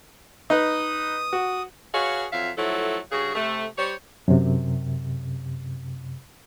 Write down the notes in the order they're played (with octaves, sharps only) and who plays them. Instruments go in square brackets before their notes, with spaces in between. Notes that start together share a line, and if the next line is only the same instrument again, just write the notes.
[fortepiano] D#4 B4 [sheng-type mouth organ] D#6
[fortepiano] F#4
[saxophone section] F#4 G#4 B4 C#5 F5
F2 F#3 E5 F5
F3 F#3 A3 E4 A4
G2 C#3 F#4 G#4
C3 A3
G3 C5 C#5
[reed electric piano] F#2 C3